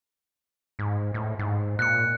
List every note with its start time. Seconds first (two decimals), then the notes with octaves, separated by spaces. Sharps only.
0.79 G#2
1.14 A2
1.39 G#2
1.79 A#2 F#6 C#7